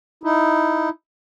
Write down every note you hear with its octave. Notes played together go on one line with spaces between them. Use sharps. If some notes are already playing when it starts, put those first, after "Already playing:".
D#4 E4